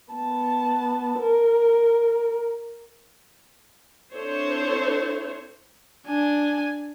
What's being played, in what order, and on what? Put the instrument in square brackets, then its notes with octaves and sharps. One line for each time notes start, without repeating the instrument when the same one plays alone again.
[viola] B3 A5
A#4
[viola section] C4 D4 E4 A4 C5 C#5
[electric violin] D4 G#5